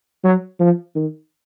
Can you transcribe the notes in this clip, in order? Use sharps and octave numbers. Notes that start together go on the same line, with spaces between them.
F#3
F3
D#3